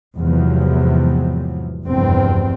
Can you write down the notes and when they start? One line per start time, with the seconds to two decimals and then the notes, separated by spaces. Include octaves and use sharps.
0.17 E2 G#2 C3 F3 F#3
1.84 F1 E2 G2 C4